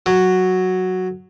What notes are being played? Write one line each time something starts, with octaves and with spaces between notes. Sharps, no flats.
F#3